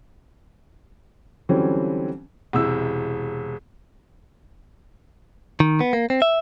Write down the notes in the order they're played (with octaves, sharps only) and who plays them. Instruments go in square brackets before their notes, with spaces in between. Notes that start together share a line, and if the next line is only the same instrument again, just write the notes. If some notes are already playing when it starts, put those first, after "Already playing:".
[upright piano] D3 E3 F#3 G3 C4 C#4
E1 C3 E4 E6
[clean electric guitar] D#3
B3
A#3
C4
E5